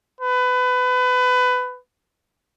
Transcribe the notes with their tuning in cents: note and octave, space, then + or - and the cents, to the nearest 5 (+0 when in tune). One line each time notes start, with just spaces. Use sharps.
B4 +25